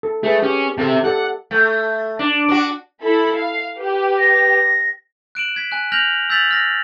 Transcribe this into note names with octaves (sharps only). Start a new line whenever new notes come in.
A4
A3 G#4 B4
C#4 G4
C3 A4 E5 F5 A5
G4 A4 D5 F#5
A3
D4
D4 F#4
E4 A4 B5
F5
G4 B4
A#6
F#6 D7 E7 F#7
G#6 B6
G#5 F#6
F6 G6 A#6 F7 F#7
E6 G6 A6 B6 F7 F#7
F6 A#6